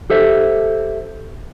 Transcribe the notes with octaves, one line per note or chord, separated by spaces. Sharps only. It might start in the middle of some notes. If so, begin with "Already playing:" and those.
G4 A4 C5 E5